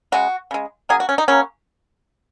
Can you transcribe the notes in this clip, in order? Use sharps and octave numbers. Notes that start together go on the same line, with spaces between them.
C#3 G#3 F#4
C#3 G#3
C#3 F#3 A#3 G#4
F#4
C#4
D#4
C#3 F#3 A#3 C#4